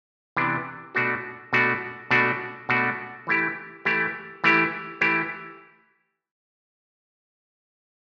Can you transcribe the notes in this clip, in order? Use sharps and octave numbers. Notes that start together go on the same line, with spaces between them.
C3 E3 B3 D4
B2 A3 D4 F#4
B2 A3 D4 F#4
B2 A3 D4 F#4
B2 A3 D4 F#4
E3 A3 E4 G4
E3 A3 E4 G4
E3 A3 E4 G4
E3 A3 E4 G4